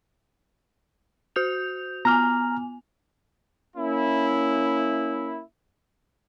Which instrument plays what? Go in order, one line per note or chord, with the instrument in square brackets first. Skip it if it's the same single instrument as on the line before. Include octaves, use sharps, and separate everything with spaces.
[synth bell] F#4 G6 F7
[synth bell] B3 G#5 [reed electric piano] A#5 F6
[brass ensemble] A#3 C#4 E4